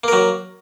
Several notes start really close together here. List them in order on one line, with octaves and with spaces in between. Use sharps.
A#3 A#4 F#3